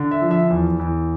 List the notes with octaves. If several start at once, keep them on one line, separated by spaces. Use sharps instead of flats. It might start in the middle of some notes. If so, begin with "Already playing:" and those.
Already playing: D3
E5
F3
E5
E2
E2